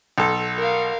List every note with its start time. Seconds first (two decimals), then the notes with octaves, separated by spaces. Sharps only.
0.18 B1 A4
0.58 A#4 F5